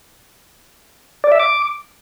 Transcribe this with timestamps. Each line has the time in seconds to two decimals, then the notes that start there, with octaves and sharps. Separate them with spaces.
1.24 D5
1.32 E5
1.40 D6